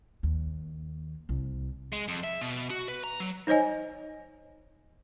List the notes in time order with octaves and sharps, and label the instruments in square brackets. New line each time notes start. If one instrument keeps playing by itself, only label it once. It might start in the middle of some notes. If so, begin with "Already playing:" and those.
[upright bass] D#2
C2
[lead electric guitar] G#3
F2
E5
B2
F#4
B4
A#5
F#3
[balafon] D#4 C5 C#5 D#5 G#5